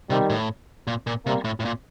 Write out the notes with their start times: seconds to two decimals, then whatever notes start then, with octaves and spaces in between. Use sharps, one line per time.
0.10 C3 D#3 G3
0.30 A2
0.87 A#2
1.07 A#2
1.26 C3 G3 A#3
1.44 A2
1.60 A2
1.65 A#2